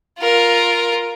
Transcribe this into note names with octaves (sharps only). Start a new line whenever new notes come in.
F4 A#4